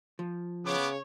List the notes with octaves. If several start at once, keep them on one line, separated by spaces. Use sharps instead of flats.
F3
C#3 B3 C#5 D6